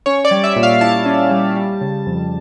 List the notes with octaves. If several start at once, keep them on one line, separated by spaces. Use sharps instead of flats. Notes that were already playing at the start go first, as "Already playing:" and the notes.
C#4 C#5
D5
G3
E5
A#2
F5
E4 A5
C#4
G3
G3
C#3
F2